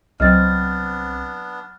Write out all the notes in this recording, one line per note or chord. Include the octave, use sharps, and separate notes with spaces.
C2 F#3 B3 C4 D4 D#5 F6 A6